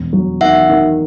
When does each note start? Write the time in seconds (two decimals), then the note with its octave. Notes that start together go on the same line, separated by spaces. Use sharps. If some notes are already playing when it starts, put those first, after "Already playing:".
Already playing: E1
0.13 F#3
0.41 D#3 E5 F#5
0.69 D#3